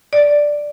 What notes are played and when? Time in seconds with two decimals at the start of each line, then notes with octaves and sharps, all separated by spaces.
0.13 D5